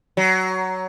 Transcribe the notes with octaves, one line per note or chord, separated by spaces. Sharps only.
F#3